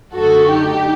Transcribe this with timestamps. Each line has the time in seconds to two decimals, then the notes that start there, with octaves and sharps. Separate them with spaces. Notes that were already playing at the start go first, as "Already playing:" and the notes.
0.15 F#2 D3 A3 F#4 A4
0.51 D#4 G4